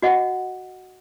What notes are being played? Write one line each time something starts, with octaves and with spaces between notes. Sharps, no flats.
F#4 D#5 F#5